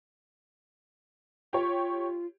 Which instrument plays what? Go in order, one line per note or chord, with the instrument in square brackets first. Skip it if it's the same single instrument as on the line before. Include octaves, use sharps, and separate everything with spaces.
[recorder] F4 [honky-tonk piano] G4 C#5